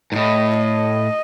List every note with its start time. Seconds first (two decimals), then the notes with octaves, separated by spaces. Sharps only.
0.12 G#2
0.15 A2 D#5
0.59 D#5